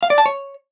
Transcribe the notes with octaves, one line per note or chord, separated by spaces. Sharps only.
F5
D5
A5
C#5